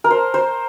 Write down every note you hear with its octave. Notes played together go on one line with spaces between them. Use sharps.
A#4
C5
C5